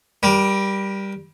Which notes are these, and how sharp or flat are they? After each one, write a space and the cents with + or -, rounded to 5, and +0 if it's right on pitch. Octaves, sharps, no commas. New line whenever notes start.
G3 +0 A#4 +30